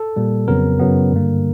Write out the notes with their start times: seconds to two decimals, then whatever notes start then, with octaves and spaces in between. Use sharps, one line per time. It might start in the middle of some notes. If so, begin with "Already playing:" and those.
Already playing: A4
0.16 A#2 G3 A#3
0.48 F2 C#3 F#3 B3 A#4
0.80 F#2 C#3 F#3 B3
1.12 G2 D3 G3 A#3